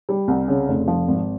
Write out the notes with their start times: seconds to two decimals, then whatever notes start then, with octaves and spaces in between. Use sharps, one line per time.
0.09 G3
0.28 C2
0.48 C#3
0.69 F1
0.88 F3
1.08 G#1